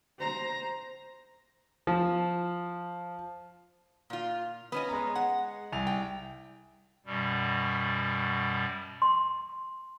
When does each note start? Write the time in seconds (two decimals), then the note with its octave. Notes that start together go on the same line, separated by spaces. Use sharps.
0.19 C5 A#5
1.87 F3
4.10 A#2 F4
4.72 B3 C#4 D#5
4.89 G#3 A#5
5.15 F#5
5.72 C2 G#5 F7
5.87 G5
7.06 F#2 B2 G3
9.02 C6